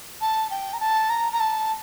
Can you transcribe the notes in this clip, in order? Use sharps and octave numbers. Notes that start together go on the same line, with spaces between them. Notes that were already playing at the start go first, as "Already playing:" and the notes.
A5
G5
A#5
A5
A#5
A#5
A5